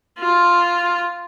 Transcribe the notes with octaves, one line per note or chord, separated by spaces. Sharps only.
F4